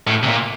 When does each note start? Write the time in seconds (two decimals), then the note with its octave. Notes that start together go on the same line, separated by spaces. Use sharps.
0.07 A2
0.23 C3
0.28 A#2